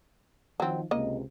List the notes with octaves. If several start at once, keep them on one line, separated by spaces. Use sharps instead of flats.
D#3 F3 F#3 C4 D#4
C#2 C3 A#3 D#5